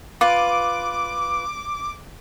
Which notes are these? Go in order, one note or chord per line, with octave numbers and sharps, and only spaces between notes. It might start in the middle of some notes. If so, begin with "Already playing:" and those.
F4 B4 D6